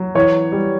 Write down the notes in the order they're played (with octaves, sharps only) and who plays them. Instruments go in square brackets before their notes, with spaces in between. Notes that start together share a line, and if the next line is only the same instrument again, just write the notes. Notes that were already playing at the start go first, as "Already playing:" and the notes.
Already playing: [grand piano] F#3
[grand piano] E3 [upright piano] C#5
[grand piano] G3